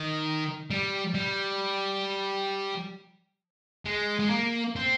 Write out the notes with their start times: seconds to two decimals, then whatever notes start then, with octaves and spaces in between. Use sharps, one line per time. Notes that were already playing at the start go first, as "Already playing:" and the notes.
Already playing: D#3
0.70 G3
1.15 G3
3.86 G#3
4.19 G#3
4.30 A#3
4.76 C4